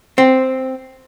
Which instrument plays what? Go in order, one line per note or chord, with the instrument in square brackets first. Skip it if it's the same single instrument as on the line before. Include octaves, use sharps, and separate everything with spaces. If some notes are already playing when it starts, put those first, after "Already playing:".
[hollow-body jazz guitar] C4